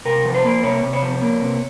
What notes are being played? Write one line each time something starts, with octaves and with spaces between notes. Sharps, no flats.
C3 A#4
F3
C5
A#3
C3 C#5
C3
C#5
F3
A#3
C3